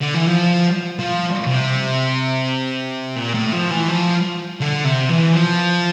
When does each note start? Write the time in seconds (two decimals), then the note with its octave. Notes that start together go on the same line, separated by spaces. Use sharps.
0.01 D3
0.14 E3
0.27 F3
0.99 F3
1.47 C3
3.16 A#2
3.34 A2
3.52 F3
3.71 E3
3.88 F3
4.61 D3
4.85 C3
5.09 E3
5.33 F3